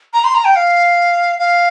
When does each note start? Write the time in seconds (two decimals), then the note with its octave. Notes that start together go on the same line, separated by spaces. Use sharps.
0.14 A#5
0.24 C6
0.35 A#5
0.45 G5
0.56 F5
1.39 F5